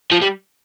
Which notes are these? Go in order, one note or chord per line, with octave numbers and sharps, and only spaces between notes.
F3
G3